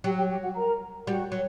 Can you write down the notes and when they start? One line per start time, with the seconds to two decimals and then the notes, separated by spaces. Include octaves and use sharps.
0.04 F#3 G4 G5
0.17 G4 G5
0.30 G4 G5
0.43 F#4 F#5
0.56 A#4 A#5
1.06 G3 F#4 F#5
1.32 F#3